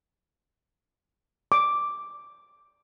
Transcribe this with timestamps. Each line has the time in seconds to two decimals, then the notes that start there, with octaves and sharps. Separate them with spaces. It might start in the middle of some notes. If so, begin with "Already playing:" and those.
1.52 D6